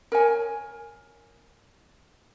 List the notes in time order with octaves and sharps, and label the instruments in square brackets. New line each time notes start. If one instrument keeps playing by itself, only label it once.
[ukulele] A#4 C#5 G#5